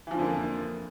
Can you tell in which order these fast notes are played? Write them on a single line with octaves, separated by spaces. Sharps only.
E3 F3 D3 F2 A#3